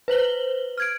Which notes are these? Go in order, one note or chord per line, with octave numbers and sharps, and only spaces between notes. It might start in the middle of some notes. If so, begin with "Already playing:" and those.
B4 C5 F#7 G7
F6 G#6 D7